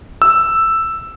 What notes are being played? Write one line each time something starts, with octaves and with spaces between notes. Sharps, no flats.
E6